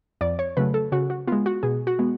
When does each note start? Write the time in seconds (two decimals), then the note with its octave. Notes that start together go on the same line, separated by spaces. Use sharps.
0.21 F2 D5
0.39 C#5
0.57 C#3 F#3 A3 B4
0.74 A4
0.92 C#3 F#4
1.10 F#4
1.27 G#3 B3 F4
1.46 F#4
1.63 B2 G#4
1.87 F#4
1.99 G#3 B3